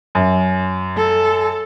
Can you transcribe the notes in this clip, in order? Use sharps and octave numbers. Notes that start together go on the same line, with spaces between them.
F#2
A4